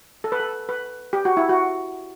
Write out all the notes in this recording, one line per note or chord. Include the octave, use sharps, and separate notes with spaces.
A4
B4
A4
B4
G4
F#4
E4
F#4